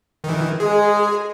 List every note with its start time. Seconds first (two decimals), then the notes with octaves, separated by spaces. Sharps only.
0.24 D#3 E3
0.60 G#3 G#4